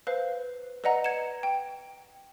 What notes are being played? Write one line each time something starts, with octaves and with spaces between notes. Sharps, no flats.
B4 C5 F5
B4 D5 D#5 F#5 A#5
G#6 C#7 E7
G5